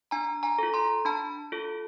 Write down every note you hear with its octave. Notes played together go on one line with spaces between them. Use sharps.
D4 G#5 A#5
G#5 A#5
F4 A4
A#5 C6
D4 A5 B5
F4 A4